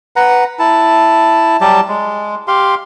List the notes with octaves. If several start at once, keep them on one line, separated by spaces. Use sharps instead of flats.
B4 F#5 A#5
E4 A5
F#3 G3 G4 A5
G#3
G4 F5 C6